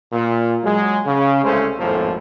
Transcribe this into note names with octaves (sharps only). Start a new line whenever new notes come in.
A#2
F#3 G#3
C#3
C2 G#3 A3 C#4 C5
G#1 F2 A2 F3 A#3